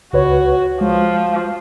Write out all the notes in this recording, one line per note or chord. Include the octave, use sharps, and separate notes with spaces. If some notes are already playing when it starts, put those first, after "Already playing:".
C#2 F#4 B4 C#5
F3 G#3